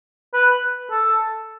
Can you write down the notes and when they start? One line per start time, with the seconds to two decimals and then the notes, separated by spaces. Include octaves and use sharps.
0.34 B4
0.91 A4